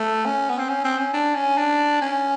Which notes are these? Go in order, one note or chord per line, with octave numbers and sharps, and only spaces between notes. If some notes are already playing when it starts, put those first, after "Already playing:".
Already playing: A3
C#4
B3
C4
C#4
C4
C#4
D4
C#4
D4
C#4